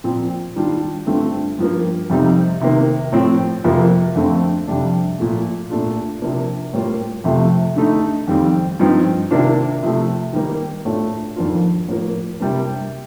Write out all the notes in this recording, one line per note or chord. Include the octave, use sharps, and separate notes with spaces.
A#2 F3 C4 F4
D#3 G3 D4 F4
G2 D3 A3 C4 F4
G2 F3 A#3
F2 C3 G3 C4 D#4
C3 D#3 A#3
A2 F3 C4
F2 C3 F3 A#3
F2 D3 A3 C4
F2 C3 G3 D4
A#2 F3 A3
A#2 A3 D4 F4
C3 F3 A#3 D4
A2 G3 A#3 F4
F2 C3 F3 A3
D3 A3 D#4
F2 D#3 G3 C4
G2 F3 C4 D#4
C3 D#3 A#3 D4 F4
C3 F3 A3
D#3 G3 A#3 D#4
A2 A3 D4 F4
F2 D#3 A#3 D4 F4
A2 F3 A#3
C3 G3 A#3 D4